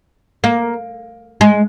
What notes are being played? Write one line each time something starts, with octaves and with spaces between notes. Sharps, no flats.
A#3
G#3